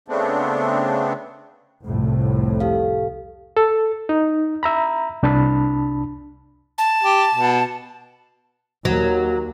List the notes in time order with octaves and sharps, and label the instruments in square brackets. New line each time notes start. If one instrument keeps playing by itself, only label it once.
[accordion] C#3 A3 B3 C4 D4
[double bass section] C2 F2 A2
[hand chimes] G4 A4 F5
[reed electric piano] A4
D#4
E5 A#5 B5
C2 D4 A5 B5
[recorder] A5
[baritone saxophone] G4
B2
[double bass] D#2 [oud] F#3